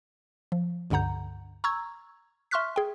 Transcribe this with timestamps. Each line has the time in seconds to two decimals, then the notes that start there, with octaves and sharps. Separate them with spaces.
0.52 F3
0.90 C#2 G2 D3 F#5 A#5 G6
1.64 A#5 C#6 E6 G#6
2.51 E5 C6 C#6 F6 F#6 B6
2.76 G#4 G5